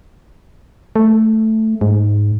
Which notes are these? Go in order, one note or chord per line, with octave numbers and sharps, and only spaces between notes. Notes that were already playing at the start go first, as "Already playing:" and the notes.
A3
G#2